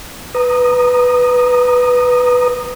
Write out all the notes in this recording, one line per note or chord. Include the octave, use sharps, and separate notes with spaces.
B4 A#5 D#6